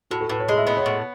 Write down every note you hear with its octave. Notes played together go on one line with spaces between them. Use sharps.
A2 F#4
A4
A2 B4
C#5
G#3 D#5
E5
B3 D#5
C#5
A2